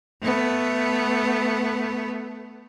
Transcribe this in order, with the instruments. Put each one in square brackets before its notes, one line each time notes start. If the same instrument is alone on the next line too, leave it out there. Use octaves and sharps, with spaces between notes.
[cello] A3 B3